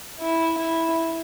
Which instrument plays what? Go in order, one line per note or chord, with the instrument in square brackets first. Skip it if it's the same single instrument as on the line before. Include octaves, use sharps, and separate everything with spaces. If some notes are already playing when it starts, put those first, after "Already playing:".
[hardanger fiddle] E4
E4